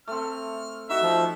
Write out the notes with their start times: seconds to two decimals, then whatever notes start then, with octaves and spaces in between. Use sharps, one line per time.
0.08 A3 C4 F6
0.90 D#4 F#4 E5
1.02 F3